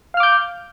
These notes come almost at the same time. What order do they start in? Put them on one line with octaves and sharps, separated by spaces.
F5 F6 D6 G6